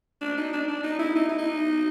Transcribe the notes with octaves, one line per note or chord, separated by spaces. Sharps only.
D4
D#4
D4
D4
D#4
E4
D#4
E4
D#4